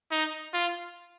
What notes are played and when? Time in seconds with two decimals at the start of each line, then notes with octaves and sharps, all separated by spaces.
0.12 D#4
0.54 F4